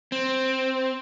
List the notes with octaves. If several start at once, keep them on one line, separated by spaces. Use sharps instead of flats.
C4